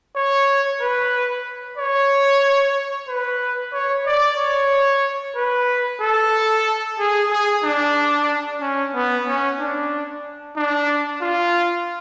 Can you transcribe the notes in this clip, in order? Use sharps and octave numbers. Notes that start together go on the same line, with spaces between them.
C#5
B4
C#5
B4
C#5
D5
C#5
B4
A4
G#4
G#4
D4
C#4
B3
C#4
D4
D4
F4